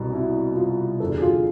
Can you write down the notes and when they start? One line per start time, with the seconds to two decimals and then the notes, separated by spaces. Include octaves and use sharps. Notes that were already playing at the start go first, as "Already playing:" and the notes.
Already playing: C2 B2
0.13 E4
0.56 F4
1.00 E2 D3 A4
1.18 G#4
1.22 F4